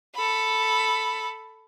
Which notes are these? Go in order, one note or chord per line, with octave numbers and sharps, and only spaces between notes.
A4 B5